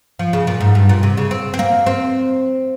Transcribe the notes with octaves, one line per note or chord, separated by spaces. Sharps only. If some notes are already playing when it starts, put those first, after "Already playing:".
F3
C#3
A#2
G#2
G2
A#2
C3
C#3
C4
C4
A#3
C4